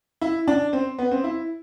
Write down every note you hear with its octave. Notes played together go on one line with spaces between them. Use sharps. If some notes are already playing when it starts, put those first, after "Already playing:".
E4
D4
C4
B3
C4
E4